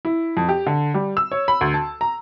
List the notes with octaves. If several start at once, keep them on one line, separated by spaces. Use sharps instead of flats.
E4
F2
G4
D3
G3
E6
C#5
B5
D2
A5
A#5